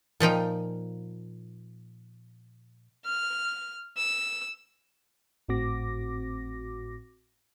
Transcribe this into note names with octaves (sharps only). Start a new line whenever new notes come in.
A#2 F3 D#4 G5
F6
E6
G#1 A2 C4 F#4 D6 A#6